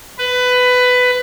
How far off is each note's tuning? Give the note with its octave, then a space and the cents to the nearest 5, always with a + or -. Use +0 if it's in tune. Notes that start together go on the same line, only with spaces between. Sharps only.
B4 +15